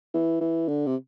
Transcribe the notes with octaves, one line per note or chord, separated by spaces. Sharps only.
E3
E3
D3
C3